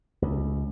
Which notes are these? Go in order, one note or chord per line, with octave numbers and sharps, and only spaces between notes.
C#2